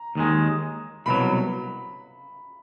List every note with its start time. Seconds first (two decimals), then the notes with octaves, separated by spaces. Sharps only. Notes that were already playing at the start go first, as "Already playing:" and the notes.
Already playing: A#5
0.15 D#2 D#3 G#3
1.06 C2 B2 F#3 B5